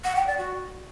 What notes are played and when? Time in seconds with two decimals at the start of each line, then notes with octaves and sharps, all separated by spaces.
0.04 F#5
0.15 G5
0.27 D5
0.38 F#4